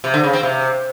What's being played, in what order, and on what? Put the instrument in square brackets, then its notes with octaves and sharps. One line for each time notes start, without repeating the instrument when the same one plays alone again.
[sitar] C3
D3
C#3
C4
C3